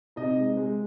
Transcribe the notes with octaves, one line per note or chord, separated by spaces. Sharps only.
C3 D#4 D#5
G#3
G#3